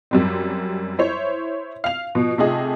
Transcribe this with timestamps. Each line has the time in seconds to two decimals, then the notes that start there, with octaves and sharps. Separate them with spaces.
0.11 F#2 G3 C4
0.99 E4 C5 C#5
1.84 F5 F7
2.15 B2 F3
2.38 C3 A3 D#4 F4 G#4